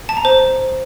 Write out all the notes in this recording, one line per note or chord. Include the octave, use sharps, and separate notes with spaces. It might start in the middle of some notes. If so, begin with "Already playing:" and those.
A5
A#5
C5